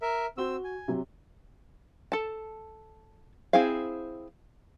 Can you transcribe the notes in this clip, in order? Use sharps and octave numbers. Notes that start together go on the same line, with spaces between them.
A#4 E5
C4 F#4 E6 G7
G#5
C3 F#3
A4 A5
C4 E4 G#4 C5 F5